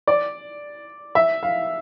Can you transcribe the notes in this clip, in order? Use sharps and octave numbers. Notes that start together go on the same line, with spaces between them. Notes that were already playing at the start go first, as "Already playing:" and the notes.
D5
E5
F5